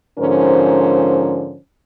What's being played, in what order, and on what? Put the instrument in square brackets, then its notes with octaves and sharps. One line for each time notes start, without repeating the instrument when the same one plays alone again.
[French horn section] G#2 D3 F3 C#4 A#4 C5